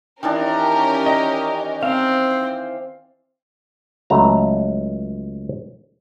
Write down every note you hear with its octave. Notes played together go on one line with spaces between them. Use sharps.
D#3 E3 C#4 D4 G4 A#4
D#5
C4 C5 F5
C#2 F#3 A3 A#5